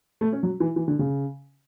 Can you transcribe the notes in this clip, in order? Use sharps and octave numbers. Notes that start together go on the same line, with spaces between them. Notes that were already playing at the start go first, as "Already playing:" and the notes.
A3
C#4
F#3
E3
E3
D3
C#3